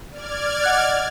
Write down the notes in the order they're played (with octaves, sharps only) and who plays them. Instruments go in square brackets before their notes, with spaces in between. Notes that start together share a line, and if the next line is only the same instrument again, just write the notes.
[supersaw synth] D5 F6 G#6
[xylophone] D#5 F#5 F#6